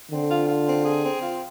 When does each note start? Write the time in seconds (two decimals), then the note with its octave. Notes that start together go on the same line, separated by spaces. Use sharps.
0.11 D3 C4
0.30 F4
0.48 F4
0.67 C4
0.85 G#4
1.04 C4
1.22 F4